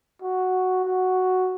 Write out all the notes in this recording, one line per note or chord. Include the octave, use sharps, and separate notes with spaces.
F#4
F#4